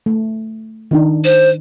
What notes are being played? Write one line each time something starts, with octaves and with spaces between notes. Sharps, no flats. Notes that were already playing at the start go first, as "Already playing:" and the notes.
A3
D#3 D4 D#4
C5